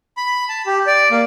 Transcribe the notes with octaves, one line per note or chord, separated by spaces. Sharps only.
B5
A5
G4
D5
A#3